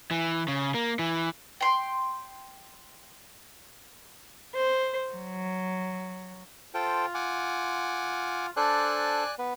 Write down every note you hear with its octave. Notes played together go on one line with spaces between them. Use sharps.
E3
C#3
A#3
E3
G5 C6
C5
F#3
F4 A4 C5 G5
F#5 G#5 D6
D4 A4 C5 D5 G#5 F#6
B3 B4